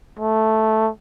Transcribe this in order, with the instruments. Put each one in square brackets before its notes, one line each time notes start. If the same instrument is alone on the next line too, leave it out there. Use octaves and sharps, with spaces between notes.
[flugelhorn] A3